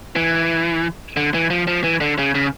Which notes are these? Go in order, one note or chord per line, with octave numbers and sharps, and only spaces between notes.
E3
D3
E3
F3
F3
E3
D3
C#3
C#3